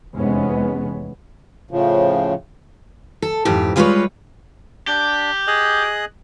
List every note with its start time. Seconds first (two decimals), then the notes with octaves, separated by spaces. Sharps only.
0.14 F1 E2 C3 G#3 B3 C#4
1.71 A2 C#3 F3
3.22 A4
3.45 F2 G#2 E3 G4
3.76 G3 G#3 F4 G#4 B4 C#5
4.88 D4 G4
5.47 G#4 D#5 F#6